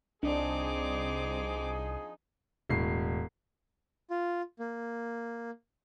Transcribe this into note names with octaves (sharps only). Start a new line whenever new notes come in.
C2 F3 C4 D4 D#4 G#4 D6
E1 A2 C7
F4
A#3